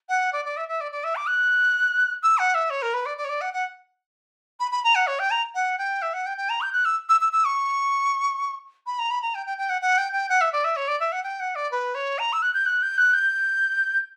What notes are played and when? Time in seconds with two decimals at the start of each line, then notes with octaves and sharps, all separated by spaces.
0.09 F#5
0.33 D5
0.45 D5
0.57 E5
0.68 E5
0.81 D5
0.92 D5
1.04 E5
1.16 D6
1.28 F#6
2.23 E6
2.38 F#5
2.54 E5
2.70 C#5
2.82 A#4
2.94 B4
3.06 D5
3.17 D5
3.25 C#5
3.29 D5
3.41 F#5
3.53 F#5
4.60 B5
4.72 B5
4.84 A#5
4.95 F#5
5.07 C#5
5.19 G5
5.31 A#5
5.55 F#5
5.78 G5
6.02 E5
6.13 F#5
6.26 G5
6.38 G5
6.49 A#5
6.61 G6
6.73 F#6
6.85 E6
7.09 E6
7.21 E6
7.33 E6
7.45 C#6
8.86 B5
8.99 A#5
9.11 B5
9.22 A#5
9.35 G5
9.46 G5
9.58 G5
9.69 F#5
9.81 F#5
9.98 G5
10.13 G5
10.29 F#5
10.41 E5
10.53 D5
10.64 E5
10.76 C#5
10.88 D5
11.00 E5
11.12 F#5
11.24 G5
11.40 F#5
11.55 D5
11.72 B4
11.95 C#5
12.19 A#5
12.33 E6
12.42 F#6
12.54 G6
12.66 F#6
12.82 G6
12.98 F#6
13.13 G6